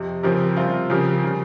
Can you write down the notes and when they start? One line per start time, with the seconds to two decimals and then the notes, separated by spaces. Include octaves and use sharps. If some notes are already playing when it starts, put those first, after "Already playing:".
Already playing: F2 C3
0.23 C#3 F3 C4 G4 A#4
0.56 C3 G3 C4 F4
0.90 C#3 F3 C4 G4 A#4
1.24 C#3 G3